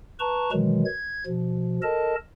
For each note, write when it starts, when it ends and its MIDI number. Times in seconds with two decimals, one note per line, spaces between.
0.20 0.51 71
0.20 0.51 81
0.20 0.51 82
0.20 0.51 85
0.52 0.84 47
0.52 0.84 51
0.52 0.84 52
0.52 0.84 54
0.52 0.84 56
0.85 1.24 92
1.27 1.80 47
1.27 1.80 53
1.83 2.15 69
1.83 2.15 70
1.83 2.15 75
1.83 2.15 81